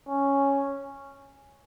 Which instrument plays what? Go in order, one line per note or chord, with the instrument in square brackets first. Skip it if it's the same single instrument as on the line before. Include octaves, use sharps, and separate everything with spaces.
[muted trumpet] C#4